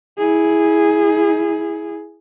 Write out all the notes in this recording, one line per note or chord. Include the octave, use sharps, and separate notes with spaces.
E4 G#4